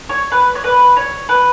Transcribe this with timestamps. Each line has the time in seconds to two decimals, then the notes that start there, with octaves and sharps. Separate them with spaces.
0.09 C#5
0.32 B4
0.55 C#5
0.64 B4
0.97 C#5
1.29 B4